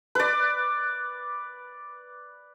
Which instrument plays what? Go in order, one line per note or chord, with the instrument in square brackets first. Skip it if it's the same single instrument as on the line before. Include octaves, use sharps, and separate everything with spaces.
[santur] B4 D5